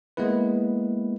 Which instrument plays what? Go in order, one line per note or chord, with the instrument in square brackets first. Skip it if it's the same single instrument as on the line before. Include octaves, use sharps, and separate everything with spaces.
[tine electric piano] G#3 A#3 B3 E4 B4